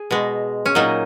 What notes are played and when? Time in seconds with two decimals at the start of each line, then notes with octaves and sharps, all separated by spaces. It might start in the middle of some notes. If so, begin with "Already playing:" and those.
Already playing: G#4
0.11 B2 G#3
0.66 C#4
0.75 A#2 F#3 D#4